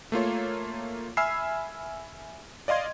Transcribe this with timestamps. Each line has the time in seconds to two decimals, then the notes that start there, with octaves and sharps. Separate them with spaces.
0.12 A3 A#3 F4 C#5
1.17 E5 G#5 B5 E6 F6 C7
2.68 D5 D#5 F5 C6 G#6